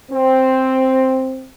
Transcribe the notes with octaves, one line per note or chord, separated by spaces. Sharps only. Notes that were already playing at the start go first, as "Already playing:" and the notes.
C4